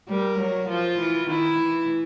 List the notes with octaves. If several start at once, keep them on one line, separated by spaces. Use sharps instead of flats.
G3 A#4
F#3
F3 F4
E3
D#3 E4
E3